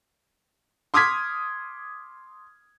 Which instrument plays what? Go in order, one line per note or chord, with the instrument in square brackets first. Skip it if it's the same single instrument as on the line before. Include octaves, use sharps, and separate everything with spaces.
[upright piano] C6 D6 D#6 F6 G#6 B6